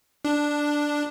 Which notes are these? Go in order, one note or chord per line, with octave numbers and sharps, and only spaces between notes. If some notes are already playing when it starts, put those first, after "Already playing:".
D4